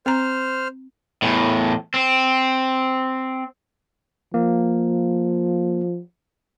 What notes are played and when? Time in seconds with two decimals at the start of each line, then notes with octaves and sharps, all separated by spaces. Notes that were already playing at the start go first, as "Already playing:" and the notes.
0.06 C4 C5 A#5 F6
1.22 E2 A2
1.94 C4
4.34 F3 A#3